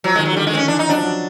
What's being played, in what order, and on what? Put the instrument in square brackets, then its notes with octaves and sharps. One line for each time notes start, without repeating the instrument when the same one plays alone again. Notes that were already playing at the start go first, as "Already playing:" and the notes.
[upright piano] F3 [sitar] F#3
[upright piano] D#3 [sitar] G#3
[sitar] F#3
[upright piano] D3 [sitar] G3
[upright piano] D#3 [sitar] G#3
[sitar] C4
C#4
[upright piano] E3 [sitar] D4
[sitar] D#4
[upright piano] F#3 [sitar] D4
[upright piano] F3
F#3